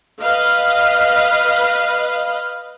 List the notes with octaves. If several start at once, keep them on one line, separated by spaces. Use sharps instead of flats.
B4 D#5 F5